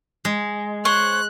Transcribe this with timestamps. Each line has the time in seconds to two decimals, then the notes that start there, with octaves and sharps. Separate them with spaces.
0.25 G#3
0.85 C5 C#5 F#6